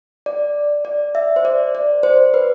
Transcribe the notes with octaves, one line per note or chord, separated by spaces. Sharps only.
D5
D5
E5
C5
D5
D5
C5
B4